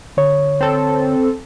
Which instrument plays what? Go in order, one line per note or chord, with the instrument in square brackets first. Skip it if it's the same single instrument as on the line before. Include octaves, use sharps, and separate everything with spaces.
[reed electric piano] D3 C#5
[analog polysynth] C4 A4